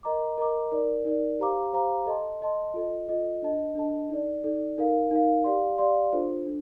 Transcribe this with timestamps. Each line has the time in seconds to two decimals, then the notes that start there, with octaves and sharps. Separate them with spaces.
0.03 A#4 D#5 A#5 D6
0.38 A#4 D#5 A#5 D6
0.71 D#4 A#4 D5
1.05 D#4 A#4 D5
1.39 G4 C5 F5 A#5 D6
1.73 G4 C5 F5 A#5 D6
2.06 A4 D#5 A5 C6
2.41 A4 D#5 A5 C6
2.74 F4 A4 D#5
3.09 F4 A4 D#5
3.42 D4 A4 D#5 A5
3.75 D4 A4 D#5 A5
4.10 D#4 A4 D5
4.44 D#4 A4 D5
4.78 D#4 A#4 F5
5.11 D#4 A#4 F5
5.44 G4 D5 F5 C6
5.78 G4 D5 F5 C6
6.13 D4 F4 A4 C5
6.46 D4